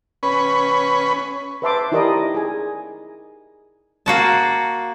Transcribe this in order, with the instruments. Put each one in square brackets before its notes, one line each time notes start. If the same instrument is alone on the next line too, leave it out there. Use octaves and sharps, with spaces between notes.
[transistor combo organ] C#4 B4
[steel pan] B4 C5 E5 A5 C6 D6
D#4 E4 G4 A#4 D5 D#5
G#4 G#5
[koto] A#3 F#4 A5